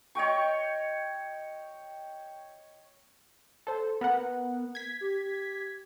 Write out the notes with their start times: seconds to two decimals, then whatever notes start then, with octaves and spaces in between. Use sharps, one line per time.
0.15 C#5 D#5 G5 C#6
3.67 A4 C5
4.01 B3 A#4 F#5
4.75 G#6 B6
5.01 G4